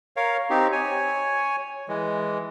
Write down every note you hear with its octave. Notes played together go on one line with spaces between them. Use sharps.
A#4 C#5 F5
C4 D#4 G4
C#5 G#5
E3 G#3